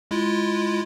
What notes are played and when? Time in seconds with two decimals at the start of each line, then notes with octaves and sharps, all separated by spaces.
0.11 G#3 E4 F4